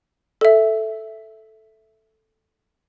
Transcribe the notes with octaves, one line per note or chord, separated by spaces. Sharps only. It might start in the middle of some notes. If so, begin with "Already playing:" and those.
A4 E5